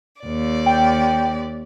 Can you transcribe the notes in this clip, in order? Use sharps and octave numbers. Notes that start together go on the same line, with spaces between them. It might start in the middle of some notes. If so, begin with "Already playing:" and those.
D#2 D5
G5